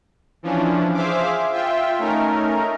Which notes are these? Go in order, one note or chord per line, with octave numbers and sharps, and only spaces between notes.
E3 F3 C#4 D4
G#4 C5 E5 F5 D6
F4 E5 G5
A3 C#4 D#4 A#4